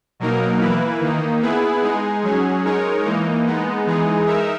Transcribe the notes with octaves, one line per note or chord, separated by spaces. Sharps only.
B2 F#3 A#3 D#4 A#4
E3 A#3 E4 B4
D#3 A#3 D#4
B3 E4 G#4 B4
G#3 D#4 G#4
F#3 C#4 G#4
G#3 D#4 A#4 C#5
E3 A#3 D#4
G#3 B3 D#4
E3 G#3 D#4 G#4
D#4 A#4 E5